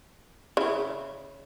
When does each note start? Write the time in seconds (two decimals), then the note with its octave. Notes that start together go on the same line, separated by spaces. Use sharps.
0.57 C#3 E4